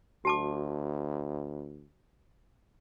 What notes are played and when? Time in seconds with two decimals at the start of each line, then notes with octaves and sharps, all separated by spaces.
0.25 D2 F#4 A5 D6